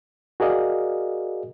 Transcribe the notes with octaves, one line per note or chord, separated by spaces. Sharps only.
F#4 G#4 A#4 D5 D#5 F5